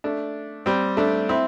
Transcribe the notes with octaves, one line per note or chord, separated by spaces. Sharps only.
A3 D4
G3 C4
A3 D4
C4 E4